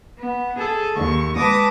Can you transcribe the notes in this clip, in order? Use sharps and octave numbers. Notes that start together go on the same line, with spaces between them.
B3
G#4 A4
D#2 C#6
G#3 B4 A5 D6 D#6 A#6